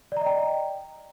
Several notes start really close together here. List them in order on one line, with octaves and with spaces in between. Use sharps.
D5 A#5 D#5 G5